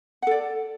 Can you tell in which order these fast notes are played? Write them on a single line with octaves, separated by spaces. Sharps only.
F#5 A4 D5